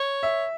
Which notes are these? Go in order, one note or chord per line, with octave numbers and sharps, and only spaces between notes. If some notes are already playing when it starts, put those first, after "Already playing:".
Already playing: C#5
E5